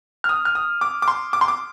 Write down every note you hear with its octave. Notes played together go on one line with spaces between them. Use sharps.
F6
D#6
F6
D#6
D6
D6
C6
D6
C6
D6